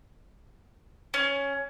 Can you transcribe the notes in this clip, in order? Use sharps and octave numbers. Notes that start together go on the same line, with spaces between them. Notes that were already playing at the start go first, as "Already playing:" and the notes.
C#4